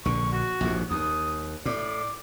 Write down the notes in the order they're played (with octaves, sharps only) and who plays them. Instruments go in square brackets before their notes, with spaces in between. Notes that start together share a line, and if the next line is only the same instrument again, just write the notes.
[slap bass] A#1 D3 [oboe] C#6
[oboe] F#4
[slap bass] A#1 D#2 G#2
[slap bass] D#2 [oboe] D#6
[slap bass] A2 [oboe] D5